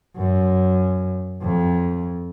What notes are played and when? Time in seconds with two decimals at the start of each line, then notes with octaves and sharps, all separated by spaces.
0.17 F#2
1.42 F2